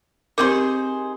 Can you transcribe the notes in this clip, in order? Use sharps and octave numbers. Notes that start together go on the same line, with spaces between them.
C4 D#4 G4 G#4 A#4 C5 D6